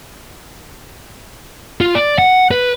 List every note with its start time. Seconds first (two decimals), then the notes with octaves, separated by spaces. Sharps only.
1.81 F4
1.95 D5
2.18 F#5
2.51 B4